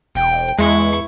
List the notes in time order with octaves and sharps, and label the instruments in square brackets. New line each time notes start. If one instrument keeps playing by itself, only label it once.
[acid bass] E1 [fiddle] G5
[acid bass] E2 [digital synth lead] G#3 [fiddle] E4 C#6